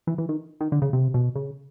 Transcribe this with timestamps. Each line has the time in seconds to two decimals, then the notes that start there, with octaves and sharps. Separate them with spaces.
0.07 E3
0.18 E3
0.29 D#3
0.61 D#3
0.72 D3
0.82 C#3
0.93 C3
1.14 B2
1.36 C#3